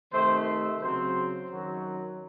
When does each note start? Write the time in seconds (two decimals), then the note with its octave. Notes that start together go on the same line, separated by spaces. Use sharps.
0.13 C3 D#3 A3 C5
0.81 C#3 F#3 C4 C5
1.49 F#2 D#3 F#3